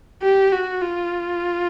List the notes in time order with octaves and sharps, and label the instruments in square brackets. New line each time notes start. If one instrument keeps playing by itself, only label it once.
[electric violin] G4
F#4
F4